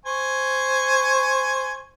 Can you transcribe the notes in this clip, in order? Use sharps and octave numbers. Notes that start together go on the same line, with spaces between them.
C5 G#5 C#6